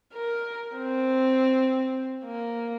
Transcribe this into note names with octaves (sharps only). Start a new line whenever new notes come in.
A#4
C4
A#3